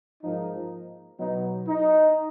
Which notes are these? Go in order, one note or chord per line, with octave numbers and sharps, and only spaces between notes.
G#2 F3 A#3 D#4
B2 F#3 B3 D#4
D#4